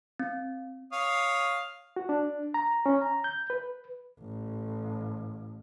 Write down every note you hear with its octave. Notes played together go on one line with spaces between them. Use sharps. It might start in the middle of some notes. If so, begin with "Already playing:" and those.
C4
C#5 F5 D#6
F#4
D4
A#5
C#4
A#5
G6
B4
A1